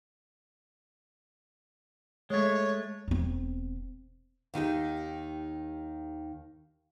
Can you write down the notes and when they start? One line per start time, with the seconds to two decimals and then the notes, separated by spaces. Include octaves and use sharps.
2.30 G#3 A3 C#5
3.08 E1 C4
4.54 D#2 D#3 D#4 G4